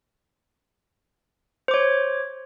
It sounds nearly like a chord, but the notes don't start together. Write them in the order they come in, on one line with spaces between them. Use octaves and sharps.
C5 D6 C#5